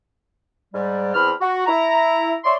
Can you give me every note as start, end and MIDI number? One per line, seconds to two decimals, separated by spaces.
0.74 1.11 44
0.74 1.11 55
1.14 1.30 40
1.14 1.30 60
1.14 1.30 83
1.14 1.30 89
1.41 1.64 66
1.66 2.36 64
1.66 2.36 82
2.44 2.55 73
2.44 2.55 74
2.44 2.55 76
2.44 2.55 84